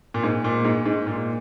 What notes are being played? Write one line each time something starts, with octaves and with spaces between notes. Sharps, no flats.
A#2
G#2
A#2
G#2
G#2
A#2